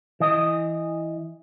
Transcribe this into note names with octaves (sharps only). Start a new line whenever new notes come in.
E3 D#5